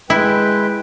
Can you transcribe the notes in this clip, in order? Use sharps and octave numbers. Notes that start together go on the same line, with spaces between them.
G#3 E4 B4 G5